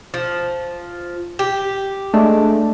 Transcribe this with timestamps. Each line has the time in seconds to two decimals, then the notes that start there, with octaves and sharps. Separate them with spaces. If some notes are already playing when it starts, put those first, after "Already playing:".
0.14 F3
1.39 G4
2.14 G#3 A3 D4